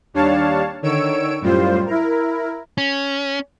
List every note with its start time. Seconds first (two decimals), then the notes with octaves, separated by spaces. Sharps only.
0.14 D#2 G3 D4 C#5 F5 A5
0.82 D3 D#3 C#5 E6 D7
1.41 F#2 A2 G3 F4 C5
1.86 E4 A#4
2.78 C#4